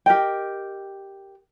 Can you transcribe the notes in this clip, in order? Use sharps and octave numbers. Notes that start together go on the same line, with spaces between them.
G4 A#4 D#5 G5